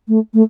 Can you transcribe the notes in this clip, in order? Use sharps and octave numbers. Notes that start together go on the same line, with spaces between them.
A3
A3